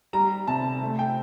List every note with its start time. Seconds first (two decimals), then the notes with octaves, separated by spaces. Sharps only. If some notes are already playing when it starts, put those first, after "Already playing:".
0.13 G3 A#5
0.48 C3 A5
0.82 A3
0.99 G5